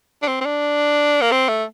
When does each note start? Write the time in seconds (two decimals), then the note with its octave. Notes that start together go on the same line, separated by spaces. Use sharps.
0.22 D4
0.28 C4
0.41 C4
0.46 D4
1.21 A#3
1.32 C4
1.48 A3